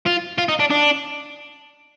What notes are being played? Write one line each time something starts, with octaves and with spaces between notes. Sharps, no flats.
F4
F4
D#4
D4
D4